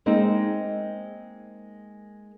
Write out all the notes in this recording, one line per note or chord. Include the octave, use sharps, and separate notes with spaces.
G#3 A#3 C4 D#4